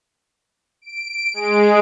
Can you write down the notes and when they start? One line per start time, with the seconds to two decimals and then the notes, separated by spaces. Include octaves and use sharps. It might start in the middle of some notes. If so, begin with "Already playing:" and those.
0.82 D7
1.34 G#3